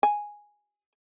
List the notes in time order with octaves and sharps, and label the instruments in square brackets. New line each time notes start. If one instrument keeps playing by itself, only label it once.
[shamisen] G#5